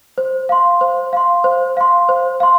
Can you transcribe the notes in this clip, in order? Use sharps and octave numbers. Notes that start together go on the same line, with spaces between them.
C5
F5 C6
C5
F5 C6
C5
F5 C6
C5
F5 C6